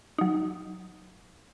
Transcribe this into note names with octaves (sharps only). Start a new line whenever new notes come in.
F#3 D#4